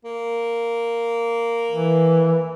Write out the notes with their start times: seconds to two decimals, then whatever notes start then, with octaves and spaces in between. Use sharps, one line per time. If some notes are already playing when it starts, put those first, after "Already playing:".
0.05 A#3
1.71 E3